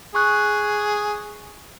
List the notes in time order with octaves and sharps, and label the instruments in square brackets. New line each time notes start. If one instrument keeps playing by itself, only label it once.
[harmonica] G#4 [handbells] C#6 F#6